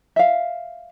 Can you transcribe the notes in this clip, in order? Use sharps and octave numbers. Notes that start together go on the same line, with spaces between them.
E5 F5